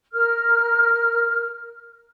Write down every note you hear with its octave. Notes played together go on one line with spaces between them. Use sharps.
A#4 F6